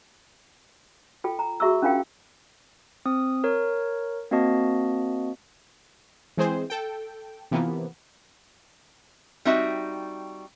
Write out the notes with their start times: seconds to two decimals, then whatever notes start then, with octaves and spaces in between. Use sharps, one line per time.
1.24 F4 A4 G5
1.39 A#5
1.60 F#4 G#4 E5 A#5 C#6 E6
1.82 C#4 D4 F4 A#4 F5 G5
3.05 C4 D#6
3.44 A#4 C#5
4.31 A#3 C4 F#4 D#5 A5
6.37 E3 G#3 C4 G#4 C5
6.70 A4 G5
7.51 C3 E3 F3 A#3 B3
9.45 G3 C4 D#4 F#4 E5